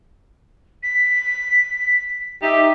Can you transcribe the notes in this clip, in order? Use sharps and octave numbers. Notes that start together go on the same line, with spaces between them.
B6
D#4 G4 E5